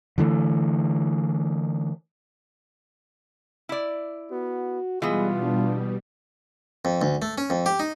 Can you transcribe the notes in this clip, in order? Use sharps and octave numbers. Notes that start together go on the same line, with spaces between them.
D3 E3 G3 A3
E4 D5
B3 F#4
B2 E3 G3 G#3 B3 F4
D4
F2
D2
A3
C#4
F2
G4
D#4